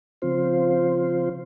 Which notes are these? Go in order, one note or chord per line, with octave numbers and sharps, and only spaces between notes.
C#3 F3 C4 F4 C5